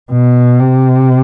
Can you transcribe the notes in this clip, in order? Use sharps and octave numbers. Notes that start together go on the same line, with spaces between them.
B2
C3